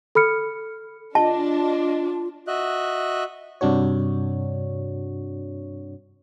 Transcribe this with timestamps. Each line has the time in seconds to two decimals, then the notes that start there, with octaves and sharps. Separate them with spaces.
0.15 A4 B5 F6 C#7
1.15 D4 F4 D#5 A5
2.47 F#4 D#5 E5 F#6
3.61 G2 C3 D4 F#4 C#5